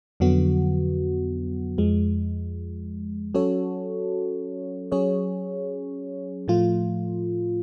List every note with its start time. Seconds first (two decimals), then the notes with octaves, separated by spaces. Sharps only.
0.20 F2 D3 F#3 B3 F#4
1.78 F2 F3 G#3
3.35 F#3 C#4 F#4 A4 C#5
4.92 F#3 C#4 G#4 C#5
6.48 A2 F3 A3 F4